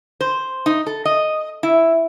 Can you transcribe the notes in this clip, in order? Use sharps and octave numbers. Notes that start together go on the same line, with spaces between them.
C5
D#4
A4
D#5
E4